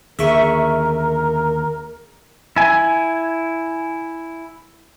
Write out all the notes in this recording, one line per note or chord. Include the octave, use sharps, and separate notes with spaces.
D#2 D3 G#4 A#4 E5 C#6
E4 G#5